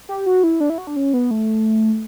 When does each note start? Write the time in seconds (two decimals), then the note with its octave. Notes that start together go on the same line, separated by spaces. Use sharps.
0.09 G4
0.26 F#4
0.44 E4
0.60 D4
0.70 E4
0.78 F#4
0.87 D4
0.96 C#4
1.14 B3
1.31 A3